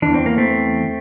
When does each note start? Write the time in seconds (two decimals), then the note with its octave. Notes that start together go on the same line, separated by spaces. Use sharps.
0.02 E2 E3 D4
0.14 C4
0.26 A#3
0.38 A3 C4